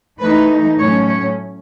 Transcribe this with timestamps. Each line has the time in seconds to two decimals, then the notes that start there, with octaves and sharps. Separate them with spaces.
0.19 E3 A3 D#4 B4
0.78 A2 F#3 A3 C#4 C#5
1.08 C#5